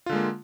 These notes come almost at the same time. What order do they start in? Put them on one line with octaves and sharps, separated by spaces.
F4 D3 G#3 A#3